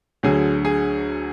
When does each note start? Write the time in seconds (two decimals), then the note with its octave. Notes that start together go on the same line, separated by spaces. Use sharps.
0.23 D2 D3 F#3 G#4
0.65 G#4